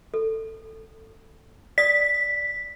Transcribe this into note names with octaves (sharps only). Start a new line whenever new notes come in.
A4
D5 D#6 B6